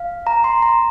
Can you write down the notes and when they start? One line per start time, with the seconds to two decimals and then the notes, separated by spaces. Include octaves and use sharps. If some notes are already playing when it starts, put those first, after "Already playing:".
Already playing: F5
0.27 A#5
0.44 C6
0.62 A#5